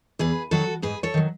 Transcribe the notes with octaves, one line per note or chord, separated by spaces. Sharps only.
E2 G#4 B4
D#3 F#3 F#4 A4
G#2 G#4 B4
A4 C#5
D#3 F#3